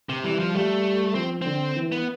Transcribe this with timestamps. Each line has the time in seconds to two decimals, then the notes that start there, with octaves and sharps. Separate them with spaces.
0.09 C3
0.24 E3 G3
0.39 F3
0.54 G3 A3
1.15 F3 C4
1.42 D3 C4
1.76 E3
1.92 B3